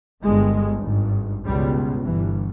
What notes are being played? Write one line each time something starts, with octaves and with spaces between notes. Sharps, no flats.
G1 G2 G#3
G#1 G2
C#2 B2 G3
G1 G2 E3